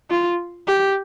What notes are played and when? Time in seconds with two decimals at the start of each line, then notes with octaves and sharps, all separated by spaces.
0.10 F4
0.67 G4